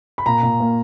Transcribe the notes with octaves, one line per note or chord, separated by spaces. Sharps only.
B5
A#2 A#5
A#2
A#3